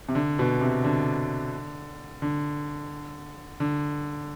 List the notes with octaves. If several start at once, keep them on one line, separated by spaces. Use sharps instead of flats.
C3
D3
B2
C3
D3
D3
D3